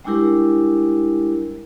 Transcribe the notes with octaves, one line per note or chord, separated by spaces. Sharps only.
G3 G#3 D4 E4 G4 A#4